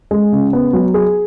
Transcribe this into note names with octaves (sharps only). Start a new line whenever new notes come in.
G#3
C#3
B3
F#3
G#4